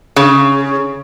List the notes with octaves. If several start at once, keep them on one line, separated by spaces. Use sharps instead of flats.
C#3